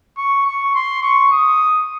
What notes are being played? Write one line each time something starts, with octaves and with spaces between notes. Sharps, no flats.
C#6
C#6
C6
C#6
D#6